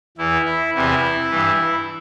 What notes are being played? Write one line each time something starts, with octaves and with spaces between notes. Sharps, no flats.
E2 E3 E4
E4
E2 C3 E3 E4
G2 E3